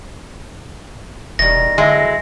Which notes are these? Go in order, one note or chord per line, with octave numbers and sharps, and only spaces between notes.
E1 D#3 G3 A#6
D3 F#3 G#3 E4